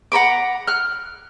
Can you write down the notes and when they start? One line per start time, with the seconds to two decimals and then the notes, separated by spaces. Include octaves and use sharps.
0.12 F#5 A#5 B5 D6
0.67 F6 F#6